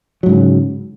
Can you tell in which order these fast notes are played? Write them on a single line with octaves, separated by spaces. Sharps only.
F#3 G#2 C#3